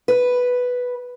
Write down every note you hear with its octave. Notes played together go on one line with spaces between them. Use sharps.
B4